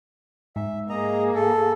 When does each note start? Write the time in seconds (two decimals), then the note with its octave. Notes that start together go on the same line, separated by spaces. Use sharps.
0.56 G#2 E5
0.89 A#3 G#4 D#5 A#5
1.35 A4